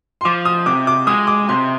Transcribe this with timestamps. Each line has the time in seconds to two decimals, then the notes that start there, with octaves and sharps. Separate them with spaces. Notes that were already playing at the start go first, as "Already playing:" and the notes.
0.21 C6
0.25 F3 D6
0.45 D#6
0.66 C3 D6
0.87 D6
1.07 G#3 D#6
1.27 D6
1.49 C3 C6